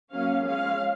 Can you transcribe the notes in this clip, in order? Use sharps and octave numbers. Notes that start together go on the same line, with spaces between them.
F#3 A#3 C#4 F5
F3 G#3 C#4 F5